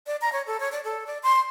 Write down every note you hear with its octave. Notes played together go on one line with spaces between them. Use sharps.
D5
A#5
C#5
A4
C#5
D5
A4
D5
C6